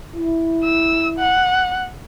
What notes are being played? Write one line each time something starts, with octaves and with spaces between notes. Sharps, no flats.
E4
E6
F#5